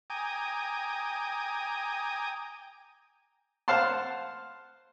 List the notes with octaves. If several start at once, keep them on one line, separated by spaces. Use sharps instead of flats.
G5 G#5 A#5 D6 D#6
C5 F5 F#5 A5 C6